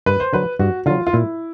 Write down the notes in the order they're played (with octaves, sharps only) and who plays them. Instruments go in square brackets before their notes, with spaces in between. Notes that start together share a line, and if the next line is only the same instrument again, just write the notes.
[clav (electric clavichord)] G2 [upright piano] B4
[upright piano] C5
[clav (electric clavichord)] D3 F#3 [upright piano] B4
[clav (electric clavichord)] G2 [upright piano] F#4
[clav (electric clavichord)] D3 F#3 [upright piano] F4
[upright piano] F4
[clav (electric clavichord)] A#2 [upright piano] E4